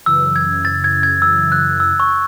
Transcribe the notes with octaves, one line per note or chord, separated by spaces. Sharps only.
F#2 C#3 E3 E6
G#6
A6
G#6
G#6
E6
F#6
E6
C#6